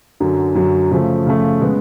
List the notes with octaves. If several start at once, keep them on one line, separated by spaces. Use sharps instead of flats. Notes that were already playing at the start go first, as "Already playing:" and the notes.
F#2 D3 F#3
F#2 D3 F#3
C#3 F3 A3
C#3 F3 A3
C#3 G#3 B3